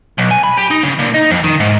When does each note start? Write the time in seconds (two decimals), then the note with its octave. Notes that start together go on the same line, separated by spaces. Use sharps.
0.18 B1
0.31 G#5
0.44 B5
0.57 G4
0.71 D#4
0.83 C#3
0.99 A#2
1.14 D#4
1.31 F2
1.44 D#3
1.60 G#2